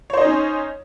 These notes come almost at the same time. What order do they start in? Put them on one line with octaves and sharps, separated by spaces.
C#5 C5 D#5 D#4 C#4